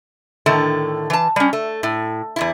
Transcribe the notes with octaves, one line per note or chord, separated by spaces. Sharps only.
A2 D3 D#3 A3
E3 A5
G3 C#4
A3
A2
E2 G2 E4